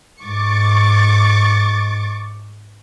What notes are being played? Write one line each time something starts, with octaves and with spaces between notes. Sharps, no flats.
G#2 C#6 D6 A6